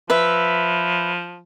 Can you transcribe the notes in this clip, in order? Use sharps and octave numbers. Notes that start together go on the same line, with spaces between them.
F3 B4 E5